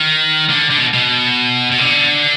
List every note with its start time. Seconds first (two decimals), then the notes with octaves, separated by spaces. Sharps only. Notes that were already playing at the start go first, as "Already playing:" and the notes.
Already playing: D#3
0.50 D3
0.70 D3
0.78 B2
0.94 B2
1.72 B2
1.78 D3